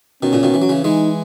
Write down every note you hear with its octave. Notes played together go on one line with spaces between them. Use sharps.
B2 D#3 C#4
A#2 C#3
B2 D#3
E3
F#3
C#3 E3
E3 G#3 D#4